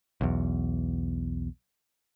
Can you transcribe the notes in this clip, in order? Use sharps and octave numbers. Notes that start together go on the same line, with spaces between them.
B1 E2